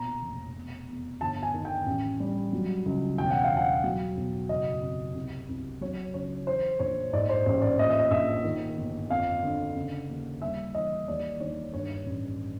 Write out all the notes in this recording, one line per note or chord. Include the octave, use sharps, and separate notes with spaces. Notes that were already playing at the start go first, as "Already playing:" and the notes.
Already playing: A#1 B2 A#5
F1
B2
E2
G1 A5
G#5
D#3
G5
A1
G3
F#3
C#2
E1 G5
F#5
F5
E1
F#5
F#3
B1
F#1 D#5
C3
C2
C2
F#3 C#5
C#2 C#5
E3 C5
A#1 C#5
G#2 D5
C5
A1 C#5
D5
A#2 D#5
E5
D#5
A#1 E5
D#3
G1
F2 F5
D3
C#3
D#2
G3 E5
E3 D#5
D#2 D5
D#3 C#5
G2 C#5
A1